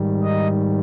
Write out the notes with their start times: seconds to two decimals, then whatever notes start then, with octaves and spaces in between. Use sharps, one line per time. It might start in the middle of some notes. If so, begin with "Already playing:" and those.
Already playing: G#2 D#3 G3
0.23 D#4 D#5